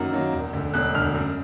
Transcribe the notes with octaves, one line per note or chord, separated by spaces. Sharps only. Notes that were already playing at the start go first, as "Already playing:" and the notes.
Already playing: F#2 D#3 F#3 A#3
D#3 F#3 A#3
E1
D2 D3
E1 F#6
D2 D3 F6
F#2